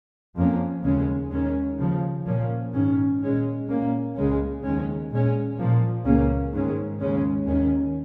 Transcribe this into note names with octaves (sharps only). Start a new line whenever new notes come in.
F2 F3 A#3 C#4
D#2 C#3 G#3 C#4
D#2 D#3 G#3 C#4
D#2 C#3 F3
A#2 F3 A#3 C#4
G#2 D#3 C#4
A#2 G#3 C#4
A#2 A#3 C#4
C#2 C#3 G#3 C#4
D#2 D#3 G#3 C#4
A#2 G#3 C#4
A#2 F3 A#3
C#2 C#3 A#3 C#4
G#2 D#3 G#3 C#4
D#2 C#3 G#3 C#4
D#2 D#3 C#4